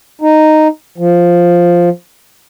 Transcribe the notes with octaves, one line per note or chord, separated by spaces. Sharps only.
D#4
F3